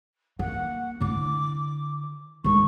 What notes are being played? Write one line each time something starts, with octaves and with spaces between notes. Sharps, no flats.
A#3 F#5
D3 E4 D6
D#3 G#3 C#6